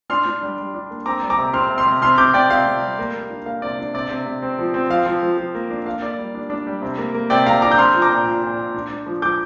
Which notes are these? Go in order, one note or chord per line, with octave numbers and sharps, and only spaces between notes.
D4 C6 F6
D4
G3
G3
D4
A#3
C4 A#5 D6
G3
A#5 D6
C3
C4 C6 F6
C3
C6 F6
C3
C3 C6 F6
C3 D6 G6
C3 D5 G5
C3 F5
C3
G3
A#3
A#3
D4
A#3 F5
C3 D5
D4
C3 D5
C3
C3
C4
F3
C4
F3 F5
F3
F3
F3
A#3
D4
A#3 F5
A#3 D5
G3
D4
D4
G3
C3
A#3
A#3
C3 D5 G5
C3 F5 A#5
D4 A#5 D6
G6
C4 C6 F6
F3
A#5 D6
A#2
A#2
A#2
A#2
D4
D4
F3
F3 D6 G6